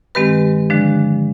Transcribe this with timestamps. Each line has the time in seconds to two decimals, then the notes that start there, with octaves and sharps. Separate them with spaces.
0.15 G2 D#3 G#3 C4 G4 B4
0.70 D3 F3 G#3 D4